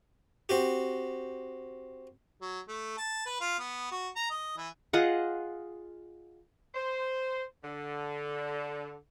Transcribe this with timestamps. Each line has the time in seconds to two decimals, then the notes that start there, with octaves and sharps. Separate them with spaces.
0.49 C4 F#4 G4
2.41 F#3
2.68 A3
2.98 A5
3.26 B4
3.41 F4
3.59 B3
3.91 F#4
4.16 A#5
4.31 D#5
4.57 E3
4.93 F4 G#4 D#5 F#5
6.75 C5
7.63 D3